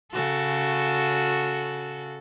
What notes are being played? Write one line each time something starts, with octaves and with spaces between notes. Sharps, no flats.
C#3 F#4 A4